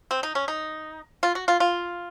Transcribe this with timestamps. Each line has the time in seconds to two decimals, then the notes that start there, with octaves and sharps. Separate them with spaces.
0.11 C4
0.23 D#4
0.35 C#4
0.48 D#4
1.23 F4
1.35 F#4
1.48 F4
1.60 F4